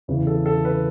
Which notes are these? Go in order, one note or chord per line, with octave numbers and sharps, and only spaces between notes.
E2 C#3 E3
A4
A4
B4